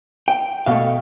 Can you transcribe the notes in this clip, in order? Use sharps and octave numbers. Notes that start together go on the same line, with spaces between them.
G5
B2 A3 F5